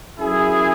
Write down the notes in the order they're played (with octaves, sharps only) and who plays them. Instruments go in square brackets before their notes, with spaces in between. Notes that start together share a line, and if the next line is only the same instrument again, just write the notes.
[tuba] F#2 [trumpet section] E4 G#4